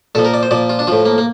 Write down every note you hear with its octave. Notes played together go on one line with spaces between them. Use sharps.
A#2 F3 A4
A#4
D5
C5
A#2 F3 D5
F4
D4
A2 F3 F4
A#3
A#3